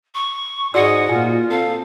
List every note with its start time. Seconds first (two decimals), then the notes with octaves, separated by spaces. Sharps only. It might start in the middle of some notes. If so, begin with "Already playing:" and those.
0.14 C#6
0.74 G#2 F#4 G#4 D5 D#5 F#5 E6
1.09 A#2 A#3 F4 G#5
1.50 C4 A4 F5